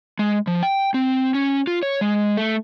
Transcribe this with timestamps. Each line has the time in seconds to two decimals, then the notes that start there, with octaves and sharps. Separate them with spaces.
0.19 G#3
0.47 F3
0.63 G5
0.94 C4
1.34 C#4
1.67 F4
1.83 C#5
2.01 G#3
2.37 A3